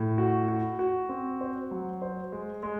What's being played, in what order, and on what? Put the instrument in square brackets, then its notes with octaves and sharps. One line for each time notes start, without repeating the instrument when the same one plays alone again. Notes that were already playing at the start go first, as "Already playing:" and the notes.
Already playing: [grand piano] A2
F#4
F#4
F#4
C4
C5
F#3
C5
G#3
G#3